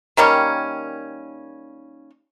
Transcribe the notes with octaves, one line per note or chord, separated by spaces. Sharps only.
D#3 G3 A#3 C#4